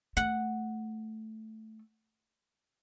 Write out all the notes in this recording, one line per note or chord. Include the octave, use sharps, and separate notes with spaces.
A3 F#5